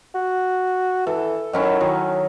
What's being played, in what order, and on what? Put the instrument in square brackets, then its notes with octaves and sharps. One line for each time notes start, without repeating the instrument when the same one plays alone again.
[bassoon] F#4
[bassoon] E3 [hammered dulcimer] A4
[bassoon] D#3 [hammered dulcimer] F#3 C#4 E4
[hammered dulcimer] D#3 [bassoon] F#3